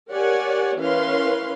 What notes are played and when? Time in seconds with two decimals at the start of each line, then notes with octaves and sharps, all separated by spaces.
0.11 G4 A#4 C#5 D5 F#5 G#5
0.78 E3 C#4 A#4 B4 F5 C6